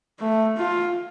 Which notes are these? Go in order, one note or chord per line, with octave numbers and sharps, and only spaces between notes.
A3
F4